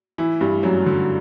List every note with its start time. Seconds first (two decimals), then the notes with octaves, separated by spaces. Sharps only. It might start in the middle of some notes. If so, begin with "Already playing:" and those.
0.18 E3 E4
0.41 G2 G3
0.63 F#2 F#3
0.86 D3